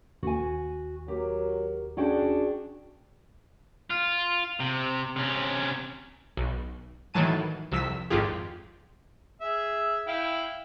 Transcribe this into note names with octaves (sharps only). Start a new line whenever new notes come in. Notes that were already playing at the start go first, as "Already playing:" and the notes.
D#2 F#4 G#5
F#3 G4 A#4
C#4 D4 F#4 G#4 G5
F4
C3
C3 C#4
B1
A2 D#3 E3 F#3 A5 D#7
C2 F2 E6 B6
G#1 F2 F4 G4 G#4
G#4 E5
E4 F5 G5